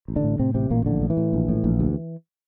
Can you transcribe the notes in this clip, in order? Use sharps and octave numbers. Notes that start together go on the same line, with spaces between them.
A1
D3 D4
A2
A2 C3 C4
A1 C3 C4
A1 A#2 A#3
A#1 D3
A2
E3
A2
A#1
A2
A#1
D2